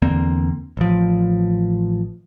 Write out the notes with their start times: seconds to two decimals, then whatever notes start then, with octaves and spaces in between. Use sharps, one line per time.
0.02 E2 D3 A#3 C4
0.77 A1 F3